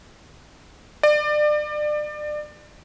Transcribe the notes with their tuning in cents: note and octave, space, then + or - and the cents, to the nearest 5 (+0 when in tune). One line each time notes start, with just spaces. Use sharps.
D5 +30